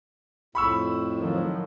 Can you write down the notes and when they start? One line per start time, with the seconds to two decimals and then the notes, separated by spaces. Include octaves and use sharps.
0.55 F2 A2 B5 C#6 E6
1.18 D#3 F3 F#3